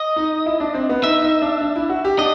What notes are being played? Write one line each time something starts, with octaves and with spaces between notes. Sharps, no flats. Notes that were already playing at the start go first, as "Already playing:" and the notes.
Already playing: D#5
D#4
E4
D4
C4
B3
D#4 E5
D#4
D4
D4
E4
F#4
G4
D4 D#5